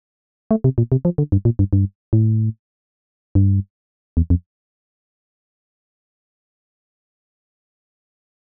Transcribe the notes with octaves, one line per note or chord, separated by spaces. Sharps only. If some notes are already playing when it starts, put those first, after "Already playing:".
A3
C3
A#2
C3
F3
D3
G2
A#2
G2
G2
A2
G2
E2
F2